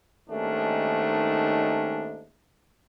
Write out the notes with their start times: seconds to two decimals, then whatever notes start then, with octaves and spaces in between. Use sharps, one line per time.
0.30 D#2 G#2 D#3 A3 C#4 D4